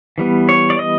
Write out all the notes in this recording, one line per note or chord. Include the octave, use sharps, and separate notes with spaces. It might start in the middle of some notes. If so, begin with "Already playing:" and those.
E3 G3 B3
C#5
D5
D#5